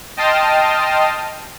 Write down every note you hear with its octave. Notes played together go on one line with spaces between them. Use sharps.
D#5 G5 A5 C6 D#6 F6